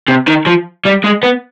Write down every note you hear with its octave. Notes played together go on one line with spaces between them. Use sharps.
C3
D#3
F3
G3
G#3
B3